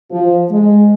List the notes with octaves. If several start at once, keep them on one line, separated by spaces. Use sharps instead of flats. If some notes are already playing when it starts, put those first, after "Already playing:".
F3
G#3